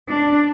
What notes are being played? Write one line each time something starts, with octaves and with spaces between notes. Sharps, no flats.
D4